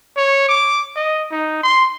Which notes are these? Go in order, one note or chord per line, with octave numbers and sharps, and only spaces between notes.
C#5
D6
D#5
D#4
C6